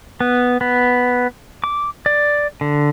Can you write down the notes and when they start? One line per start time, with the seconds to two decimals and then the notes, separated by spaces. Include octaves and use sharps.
0.20 B3
0.61 B3
1.64 D6
2.06 D5
2.61 D3